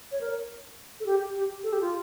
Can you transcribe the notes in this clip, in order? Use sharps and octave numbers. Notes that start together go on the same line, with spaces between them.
C#5
A#4
A4
G4
G4
A4
G4
F4